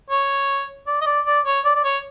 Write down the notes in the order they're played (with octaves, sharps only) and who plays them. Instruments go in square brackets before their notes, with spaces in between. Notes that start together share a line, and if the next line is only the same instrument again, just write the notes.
[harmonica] C#5
D5
D#5
D5
D5
C#5
D5
D5
C#5